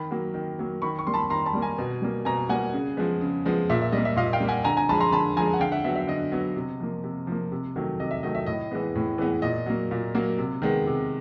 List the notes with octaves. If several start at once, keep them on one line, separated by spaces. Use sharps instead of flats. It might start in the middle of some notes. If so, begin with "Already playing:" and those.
Already playing: D#3 B5
F#3 A#3
D#3
F#3 A#3
D#3 B5 C#6
C#6
G3 A#3 C6
A5 B5
D#3 A#5 C6
A5 B5
G3 A#3
G#5 A#5
B2
G3 A#3
B2 G#5 A#5
G3 A#3 F#5 G#5
C#3
F3 G#3 B3
C#3
F3 G#3 B3
A#2 E5
E5
G3 D#5
A#3
E5
A#2 D#5 F5
F5 G5
G3 A#3
F#5 G#5
D3 G#5 A#5
G#5 A#5
F3 G#3 A5 B5
A#5 C6
D3 A5 B5
F3 G#3 G#5 A#5
F#5
D3 F5 G5
E5 F#5
F#3 B3 E5
E5
D3 D#5
F#3 B3
C3
F3 A#3
C3
F3 A#3
C3
D#3 F#3 A3
C3 D#5
E5
D#3 F#3 A3 D#5
E5
A2 D#5
E3 G#3 B3
A2
E3 G#3 B3
A#2 D#5
F#3 A#3
A#2
F#3 A#3
C3
D#3 G#3 B3
C3